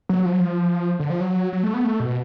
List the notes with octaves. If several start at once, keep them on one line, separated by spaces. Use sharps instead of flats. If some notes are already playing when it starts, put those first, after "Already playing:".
F#3
F3
F#3
F3
D3
F3
F#3
F#3
A3
B3
A3
B2